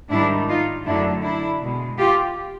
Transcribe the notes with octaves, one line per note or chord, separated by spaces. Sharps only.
G#2 D#3 G3 D4 E4
D#4 F4
F#2 D3 F#3 A3 D4 E4
D4 E4
B2 G#3
F4 G4